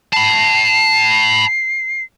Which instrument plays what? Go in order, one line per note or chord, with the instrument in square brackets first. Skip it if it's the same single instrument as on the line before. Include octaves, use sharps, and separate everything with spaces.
[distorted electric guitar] A5 B5 [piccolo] C7